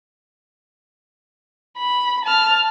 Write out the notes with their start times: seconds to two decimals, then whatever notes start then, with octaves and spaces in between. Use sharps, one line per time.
1.78 B5
2.25 A5 F6